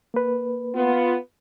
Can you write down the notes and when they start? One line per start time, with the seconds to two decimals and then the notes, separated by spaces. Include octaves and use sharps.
0.14 A#3 B4
0.74 B3 F4